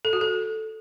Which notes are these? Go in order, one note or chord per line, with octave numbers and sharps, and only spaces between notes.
A4
F#4
A4